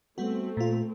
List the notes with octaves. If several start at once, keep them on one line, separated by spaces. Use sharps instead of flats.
G3 A3 B3 C4 F#4
A#2 F4